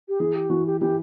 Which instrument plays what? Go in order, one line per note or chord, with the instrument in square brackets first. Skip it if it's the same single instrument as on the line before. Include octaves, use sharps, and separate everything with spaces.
[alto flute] G4
[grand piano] E3 [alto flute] G#4
[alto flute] G4
[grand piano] E3 [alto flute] F#4
[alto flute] G4
[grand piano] E3 [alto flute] G4